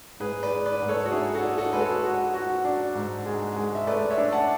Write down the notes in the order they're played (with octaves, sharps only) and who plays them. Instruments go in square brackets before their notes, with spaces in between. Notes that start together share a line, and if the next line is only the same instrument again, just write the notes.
[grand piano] G#2 [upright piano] G#4 B4
[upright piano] B4 D5
[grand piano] G#3
[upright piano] B4 D5
[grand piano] G#2
[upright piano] A4 C#5
F#4
[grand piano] D4 [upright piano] E4 G#4
[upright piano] F#4 A4
[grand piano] D4
[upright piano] F#4 A4
[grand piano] G#3 [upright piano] B4
[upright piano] A4 C#5
[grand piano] F#4
F#4
D4
G#2
G#3
G#3
[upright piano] E5
[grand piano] A3 [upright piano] B4 D5
[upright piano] C#5 E5
[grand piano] D4
[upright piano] F#5 A5